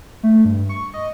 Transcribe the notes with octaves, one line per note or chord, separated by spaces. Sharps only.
A3
G2
C#6
D#5